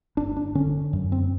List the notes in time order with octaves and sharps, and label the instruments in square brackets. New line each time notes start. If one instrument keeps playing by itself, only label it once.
[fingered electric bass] G1 D4
D4
D3 C#4
F#2
C4